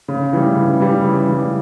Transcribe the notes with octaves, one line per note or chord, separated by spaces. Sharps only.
C#3
E3 G3
C#3
E3 G3
C#3
E3 G3